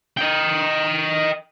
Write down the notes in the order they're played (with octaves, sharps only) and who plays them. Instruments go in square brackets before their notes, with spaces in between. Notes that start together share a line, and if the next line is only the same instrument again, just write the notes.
[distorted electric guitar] D#5 G5